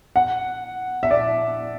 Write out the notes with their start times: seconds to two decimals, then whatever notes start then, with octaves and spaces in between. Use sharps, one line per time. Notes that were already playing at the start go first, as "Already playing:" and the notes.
0.16 F#5
1.03 E5
1.11 D5